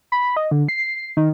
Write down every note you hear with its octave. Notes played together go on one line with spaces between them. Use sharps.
B5
D#5
D3
C7
D#3